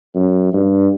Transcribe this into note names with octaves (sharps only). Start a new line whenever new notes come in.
F#2
G2